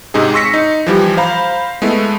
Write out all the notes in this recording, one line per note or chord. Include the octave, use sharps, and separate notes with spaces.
G#2 C3 D#4 G#4
C6 C#6 E6 A#6 B6 C#7
D#4
E3 F3 G3 G4
C5 F5 A#5 B5
G#3 A3 B3 E4